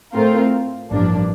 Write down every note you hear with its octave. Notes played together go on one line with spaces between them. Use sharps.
A2 A3 C4 F4 A#4
A1 G2 F3 A#3 D4